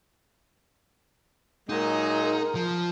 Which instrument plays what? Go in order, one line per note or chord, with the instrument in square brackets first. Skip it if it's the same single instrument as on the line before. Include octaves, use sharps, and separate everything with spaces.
[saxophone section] A#2 F#3 G#3 [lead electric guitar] D#4 [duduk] A#4
[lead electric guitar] F3